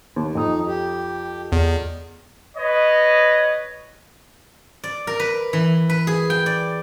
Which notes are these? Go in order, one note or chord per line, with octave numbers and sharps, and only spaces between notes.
D#2
F2 D#4 D#6
G4
E2
B4 C#5 D#5
D5
A#4
B4
E3
B4
G#4
G5
D5